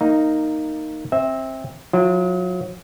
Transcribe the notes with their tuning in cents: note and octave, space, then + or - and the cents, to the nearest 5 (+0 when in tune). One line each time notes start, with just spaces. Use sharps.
A#3 -15 D#4 +0
C4 +25 E5 -15
F#3 -35 E4 +45